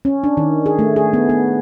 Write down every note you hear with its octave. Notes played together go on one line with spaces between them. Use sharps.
C#4
D4
D#3
G#4
A3
G#4
B3
B3